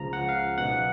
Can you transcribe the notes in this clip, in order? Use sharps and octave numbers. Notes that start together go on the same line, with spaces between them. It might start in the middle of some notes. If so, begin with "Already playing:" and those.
Already playing: C#2 C#3 F3 A#5
F#5
F5
B1 B2 F#5